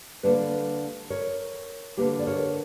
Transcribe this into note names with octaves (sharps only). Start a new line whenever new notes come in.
D3 G3 A#3 B4 D5
A#4 C#5
D3 A#3 G4 B4
D5
A#4 C#5